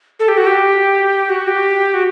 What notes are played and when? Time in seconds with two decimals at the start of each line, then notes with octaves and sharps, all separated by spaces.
0.19 A4
0.28 G4
0.37 F#4
0.47 G4
1.29 F#4
1.47 G4
1.94 F#4